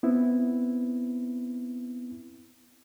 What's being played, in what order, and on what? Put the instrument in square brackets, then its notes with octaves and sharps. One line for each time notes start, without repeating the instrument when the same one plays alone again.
[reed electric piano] B3 C4 E4